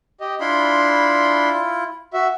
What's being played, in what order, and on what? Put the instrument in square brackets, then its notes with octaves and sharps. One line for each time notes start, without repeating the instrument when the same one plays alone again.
[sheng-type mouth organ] G4 D#5
[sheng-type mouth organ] D4 B5 C6 [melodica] E4 F4
[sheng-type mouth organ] F#4 E5